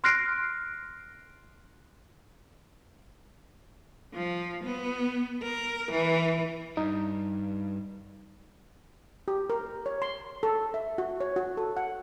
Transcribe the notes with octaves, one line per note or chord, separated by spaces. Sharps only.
C6 F6 F#6 A#6 C7 D7
F3
B3
A#4
E3
G2 D#4
G4
A#4
C#5
C6
A4
E5
F#4
C#5
F#4
A4
F#5